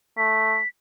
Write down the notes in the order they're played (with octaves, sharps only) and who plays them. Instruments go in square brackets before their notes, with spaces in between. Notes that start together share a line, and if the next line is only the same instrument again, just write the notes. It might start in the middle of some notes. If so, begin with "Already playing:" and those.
[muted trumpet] A3 [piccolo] B6